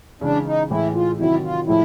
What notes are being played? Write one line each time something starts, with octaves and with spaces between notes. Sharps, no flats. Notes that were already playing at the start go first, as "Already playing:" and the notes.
C#3 E3 G#3 D4
D#4
A2 E3 G#3 E4
F4
C3 D#3 F#3 E4
F4
A2 F3 G#3 E4